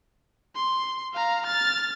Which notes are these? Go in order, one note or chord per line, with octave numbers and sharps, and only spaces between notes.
C6
F5 A#5
F6 A6